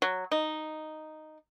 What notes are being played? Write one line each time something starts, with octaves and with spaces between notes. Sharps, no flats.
F#3
D#4